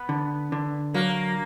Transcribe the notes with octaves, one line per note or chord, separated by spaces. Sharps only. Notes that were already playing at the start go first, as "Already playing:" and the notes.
Already playing: B3
D3
D3
F#3 A#3